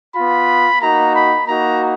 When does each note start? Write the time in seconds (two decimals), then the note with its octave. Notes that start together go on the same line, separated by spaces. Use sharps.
0.14 B3 F4 B5
0.81 A#3 D#4 F#4 A#5
1.14 B5
1.47 A#3 D#4 F#4 A#5